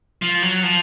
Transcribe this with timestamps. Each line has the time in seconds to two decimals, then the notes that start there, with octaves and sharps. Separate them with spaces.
0.22 F3
0.43 F#3
0.63 F3